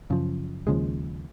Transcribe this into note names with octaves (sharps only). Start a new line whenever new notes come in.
F#2 C#3 F3
D#2 C#3 F3 G#3